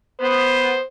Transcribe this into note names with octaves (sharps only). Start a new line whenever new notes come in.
B3 C5